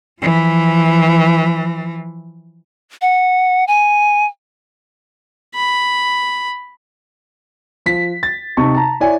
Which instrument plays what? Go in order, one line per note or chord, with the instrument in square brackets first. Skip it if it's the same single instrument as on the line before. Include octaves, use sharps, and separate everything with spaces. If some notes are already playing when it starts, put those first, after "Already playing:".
[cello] E3 F3
[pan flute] F#5
G#5
[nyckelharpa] B5
[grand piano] F3 B6
A6
C3 D#4 A5 C#6
A5 A#5
E4 C#5 D5 G#5